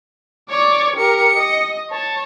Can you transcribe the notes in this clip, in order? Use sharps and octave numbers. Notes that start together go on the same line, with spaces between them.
C#5 D5
G4 A#4 C#7
D#5
C#5 A5